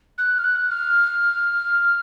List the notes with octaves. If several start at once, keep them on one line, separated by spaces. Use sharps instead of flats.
F#6
F6
F#6
F6